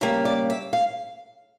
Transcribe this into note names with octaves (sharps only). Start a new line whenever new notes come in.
C#3 G3 A#3 E5
D5
E5
F5